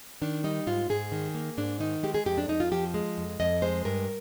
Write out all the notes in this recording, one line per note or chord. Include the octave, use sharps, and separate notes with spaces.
D#3 D4
G3 D#4
G#2 F4
G#2 G#4
D#3
A#3
G#2 D4
D#3 D#4
G#3 G4
G#4
F2 G4
D4
F2 D#4
F4
F3 G4
G#3
F2
F2 D#5
G#3 C5
G2 A#4